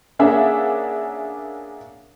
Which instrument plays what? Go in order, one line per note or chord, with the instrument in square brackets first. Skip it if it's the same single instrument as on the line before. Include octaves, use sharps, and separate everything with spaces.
[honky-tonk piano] A#3 C#4 D4 G#4 E5 F#5